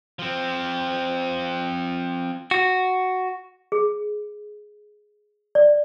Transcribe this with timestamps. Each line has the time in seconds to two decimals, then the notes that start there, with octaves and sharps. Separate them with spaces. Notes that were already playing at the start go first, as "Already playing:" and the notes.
0.19 F3 C4
2.51 F#4
3.72 G#4
5.55 D5